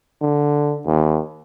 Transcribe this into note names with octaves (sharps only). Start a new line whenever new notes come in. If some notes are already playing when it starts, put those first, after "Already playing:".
D3
D#2